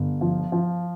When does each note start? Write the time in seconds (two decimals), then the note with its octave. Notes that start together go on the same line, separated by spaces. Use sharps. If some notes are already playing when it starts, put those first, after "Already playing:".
Already playing: G1
0.21 F3
0.52 F3